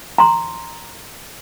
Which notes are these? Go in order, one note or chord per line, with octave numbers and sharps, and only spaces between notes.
A#5 C6